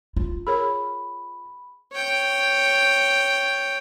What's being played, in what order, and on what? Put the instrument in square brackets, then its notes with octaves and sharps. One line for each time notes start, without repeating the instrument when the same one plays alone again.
[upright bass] F4
[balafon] G#4 A#4 C#5 [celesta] B5
[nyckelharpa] C#5 G5